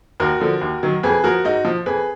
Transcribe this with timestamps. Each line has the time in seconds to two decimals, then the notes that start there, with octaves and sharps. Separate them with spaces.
0.20 D#2 F#4 A#4
0.40 D3 F3
0.61 D#2
0.83 D#3 F#3
1.03 F2 G#4 B4
1.24 F3 F#4 A#4
1.44 G#2 D#4 F#4
1.65 F3
1.86 F2 G#4 B4